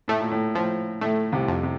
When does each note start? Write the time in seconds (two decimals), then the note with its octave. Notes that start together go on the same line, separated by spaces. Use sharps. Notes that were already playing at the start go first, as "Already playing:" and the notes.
0.08 A2 A3
0.20 A#2
0.31 A2
0.55 A2 F3
1.01 A2 A3
1.32 C2 C3
1.48 F2
1.63 C3